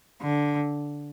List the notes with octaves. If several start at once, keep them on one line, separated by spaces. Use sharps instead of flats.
D3